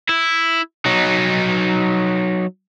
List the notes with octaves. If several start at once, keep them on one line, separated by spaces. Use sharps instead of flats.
E4
F#3 D#4